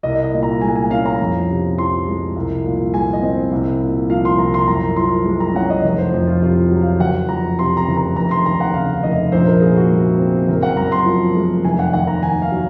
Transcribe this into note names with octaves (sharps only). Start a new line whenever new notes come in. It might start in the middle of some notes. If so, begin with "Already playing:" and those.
C2 D#5
D#5
A#2
A#5
G#3 G#5
G#5
C#4 F5
A#5
F2
C3
F3 C6
G#3
C2
A#2
G#3 G#5
D#5
C4
C2
A#2
F3 F5
C6
C2 A#5
C6
F#2 A#5
F3 C6
G#3
A#5
C#4 F#5
D#5
F1
C5
F2
F4
C3 F4
F#3
F5
F#1 F#5
F2 A#5
C3 C6
A#5
F#1
A#5
F1 A#5
C6
D#2 A#5
F#5
C#3 F5
F1 D#5
A#1 C5
A#4
A#2 G#4
F#4
G#3
C4
F#1 A#4
F#5
F#2 A#5
C6
F3
G#3
F1 G#5
F#5
D#2 F#5
A#5
D#3 G#5
F5
F#3